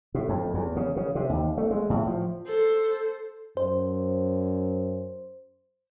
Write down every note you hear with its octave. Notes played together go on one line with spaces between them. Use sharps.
A2
F2
E2
C#3
C#3
C3
D#2
A3
G#3
A2
F3
A4 C5
F#2 C5